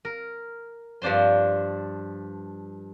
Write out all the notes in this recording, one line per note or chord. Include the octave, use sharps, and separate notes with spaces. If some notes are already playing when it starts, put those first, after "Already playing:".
A#4
G2 F3 D4 C5 C6